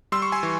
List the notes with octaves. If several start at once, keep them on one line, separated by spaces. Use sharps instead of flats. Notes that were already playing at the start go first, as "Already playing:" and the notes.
G3 C6 E6
C#6
G#5 C6
E3